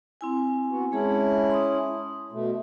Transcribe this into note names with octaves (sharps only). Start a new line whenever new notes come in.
C4 E4 G#5
B3 F#4
G#3 C#4 E4 G#4 A5
C6 D#6
B2 A3